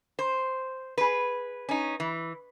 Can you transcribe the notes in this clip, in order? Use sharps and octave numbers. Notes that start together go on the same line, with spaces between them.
C5
G#4 B4
C#4 D#4
E3